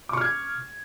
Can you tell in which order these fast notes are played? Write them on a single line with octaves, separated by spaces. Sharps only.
D6 C#6 F6 G#6